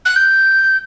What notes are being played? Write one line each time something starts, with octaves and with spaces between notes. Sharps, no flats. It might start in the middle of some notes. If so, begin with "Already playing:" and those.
F#6
G6